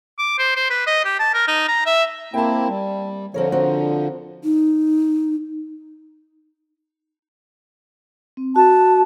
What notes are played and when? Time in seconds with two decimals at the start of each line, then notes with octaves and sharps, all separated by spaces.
0.19 D6
0.38 C5
0.56 C5
0.70 B4
0.87 D#5
1.05 G4
1.19 A5
1.34 A#4
1.47 D#4
1.68 A#5
1.86 E5
2.34 A#3 C4 E4 G5 A5
2.68 G3
3.34 D3 F3 C4 A#4 C#5
3.52 C4 F#4 A#4
4.44 D#4
8.37 C4
8.56 F#4 A5